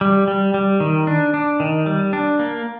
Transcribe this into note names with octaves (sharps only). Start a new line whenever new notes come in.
G3
G3
G3
D#3
D4
D4
D#3
G3
D4
A#3